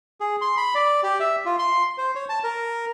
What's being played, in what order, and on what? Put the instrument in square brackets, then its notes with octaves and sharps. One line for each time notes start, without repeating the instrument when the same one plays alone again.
[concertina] G#4
C6
B5
D5
G4
E5
F4
C6
C5
C#5
A5
A#4